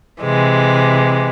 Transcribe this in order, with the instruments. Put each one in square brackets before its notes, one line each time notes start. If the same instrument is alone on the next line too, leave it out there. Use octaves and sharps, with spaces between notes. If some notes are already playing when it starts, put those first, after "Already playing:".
[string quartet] C3 E3 G#3